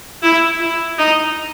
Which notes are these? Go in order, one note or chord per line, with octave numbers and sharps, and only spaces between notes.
E4
E4
D#4